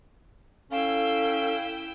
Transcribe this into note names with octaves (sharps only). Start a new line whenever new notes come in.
C#4 E4 A4 F5 G5 E6